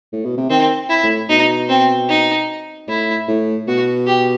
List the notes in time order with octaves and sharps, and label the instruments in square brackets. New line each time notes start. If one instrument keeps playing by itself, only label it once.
[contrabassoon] A2
B2
C3
[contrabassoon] D#3 [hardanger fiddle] C4
[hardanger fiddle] E4
[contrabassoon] A2
[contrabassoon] B2 [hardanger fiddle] D#4
[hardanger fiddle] C4
D#4
[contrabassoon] A2 [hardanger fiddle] E4
[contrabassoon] A2
[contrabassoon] B2 [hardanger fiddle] F#4
[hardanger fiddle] G4